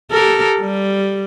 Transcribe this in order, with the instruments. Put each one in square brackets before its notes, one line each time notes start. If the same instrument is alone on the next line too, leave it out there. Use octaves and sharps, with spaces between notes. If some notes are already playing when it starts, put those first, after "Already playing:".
[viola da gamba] G4 A4 A#4
G3